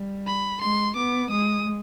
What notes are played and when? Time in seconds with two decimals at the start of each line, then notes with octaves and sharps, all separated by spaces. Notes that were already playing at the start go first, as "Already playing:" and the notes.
Already playing: G3
0.27 B5
0.61 G#3 C6
0.96 B3 D6
1.30 G#3 D#6